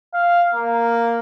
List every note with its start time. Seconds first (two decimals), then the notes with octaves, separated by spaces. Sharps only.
0.13 F5
0.54 A#3